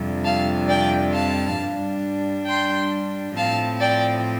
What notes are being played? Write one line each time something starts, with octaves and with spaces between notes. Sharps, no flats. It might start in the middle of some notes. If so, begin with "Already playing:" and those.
Already playing: F2 C3 G3 D4
F5 A5
D5 G5
F5 A5
G2 G3 D4
G5 C6
A2 F3 C4 F5 A5
D5 G5